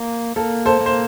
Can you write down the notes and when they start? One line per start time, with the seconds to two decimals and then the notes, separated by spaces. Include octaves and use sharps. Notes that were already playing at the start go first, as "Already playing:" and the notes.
Already playing: A#3
0.36 A#3 A4
0.66 A4 C5
0.81 A#3
0.86 C5